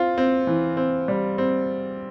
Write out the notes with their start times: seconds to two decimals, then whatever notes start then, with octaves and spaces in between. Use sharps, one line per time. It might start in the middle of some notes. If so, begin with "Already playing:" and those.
Already playing: C4 F4
0.18 C4
0.47 E3
0.77 C4
1.08 G3
1.38 C4